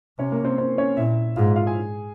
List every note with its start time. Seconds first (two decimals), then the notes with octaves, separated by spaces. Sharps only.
0.19 C3 C#4 C#5
0.32 A#3 A#4
0.45 C4 C5
0.58 C4 C5
0.78 C#4 C#5
0.97 A#2 E4 E5
1.36 G#2 F4 F5
1.56 F4 F5
1.66 G#4 G#5